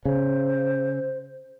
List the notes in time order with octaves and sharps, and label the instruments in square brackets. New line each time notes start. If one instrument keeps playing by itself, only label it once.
[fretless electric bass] C#3 [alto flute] C5